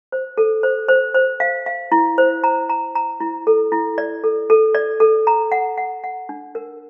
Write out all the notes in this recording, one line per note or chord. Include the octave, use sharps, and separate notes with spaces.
C5
A4
C5
C5
C5
F5
F5
E4
C5
A#5
A#5
A#5
E4
A4
E4
D5
A4
A4
D5
A4
A#5
F#5
F#5
F#5
D4
A#4